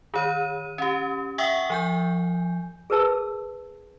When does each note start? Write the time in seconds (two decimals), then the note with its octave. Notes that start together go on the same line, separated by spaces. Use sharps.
0.14 D#3 C#5 D#7
0.78 C#4 G4
1.38 E5 F#5 G5 C#6 D#6 E6
1.70 F3 G#5 G6
2.90 G#4 A#4 B4 A5 E6